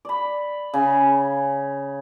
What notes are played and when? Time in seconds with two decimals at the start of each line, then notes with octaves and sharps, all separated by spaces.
0.05 D5 B5
0.73 C#3 G#5